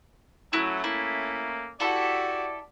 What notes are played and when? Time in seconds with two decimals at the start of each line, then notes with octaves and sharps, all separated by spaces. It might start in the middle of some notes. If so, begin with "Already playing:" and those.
0.53 F#3 A3 C#4 E4 F#4
0.84 A#3 E4
1.80 E4 F#4 G4 A4 D5